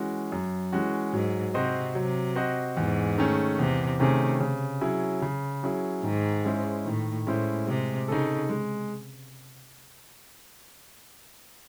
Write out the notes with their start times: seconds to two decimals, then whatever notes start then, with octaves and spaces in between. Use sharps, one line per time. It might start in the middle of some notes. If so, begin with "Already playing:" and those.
Already playing: E3 G#3 C#4 F#4
0.32 F#2
0.73 E3 G#3 C#4 F#4
1.13 G#2 F#3
1.54 C3 C4 F#4 C5 D#5
1.95 C3 F#3
2.36 C4 F#4 C5 D#5
2.77 E2 G#2
3.18 D#3 A3 C#4 G#4
3.58 E2 C3
3.99 C3 D#3 A3 C#4 G#4
4.40 C#3
4.81 F#3 C#4 E4 G#4
5.22 C#3
5.63 F#3 C#4 E4 G#4
6.04 G#2 D#3
6.45 G#3 C#4 E4 C5
6.85 A2 D#3
7.27 A2 G#3 C#4 E4 C5
7.67 C3 G#3
8.08 C#3 D#4 A4
8.49 G#3